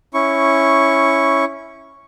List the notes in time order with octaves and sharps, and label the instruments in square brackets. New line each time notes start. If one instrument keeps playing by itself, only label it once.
[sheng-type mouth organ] C#4 E4 C#6